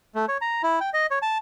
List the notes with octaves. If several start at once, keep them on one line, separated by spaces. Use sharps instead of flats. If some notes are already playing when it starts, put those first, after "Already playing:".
A3
C#5
A#5
E4
G5
D#5
C#5
A5